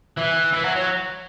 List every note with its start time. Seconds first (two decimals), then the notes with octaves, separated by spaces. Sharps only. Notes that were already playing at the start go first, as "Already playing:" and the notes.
0.18 E3
0.53 E3
0.65 F#3
0.76 F#3